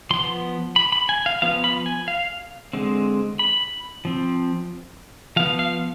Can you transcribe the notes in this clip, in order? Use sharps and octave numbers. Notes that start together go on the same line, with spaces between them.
F3 B3 C6
B5
B5
G#5
F5
F3 B3 F5
B5
G#5
F5
D3 G#3 C4
B5
F3 C4
F3 B3 F5
F5